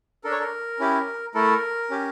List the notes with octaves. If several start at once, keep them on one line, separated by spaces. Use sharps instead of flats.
D4 A4 A#4
C#5
A#4
C#4 E4 G4
A3 E4 A4 A#4
C#4 G4